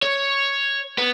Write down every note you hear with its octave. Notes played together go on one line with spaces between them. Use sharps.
C#5
B3